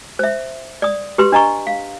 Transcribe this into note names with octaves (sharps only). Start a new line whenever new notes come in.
C5 E5
D5 D#6
G4 B4 C6
D4 D#5 A#5 C#6
F5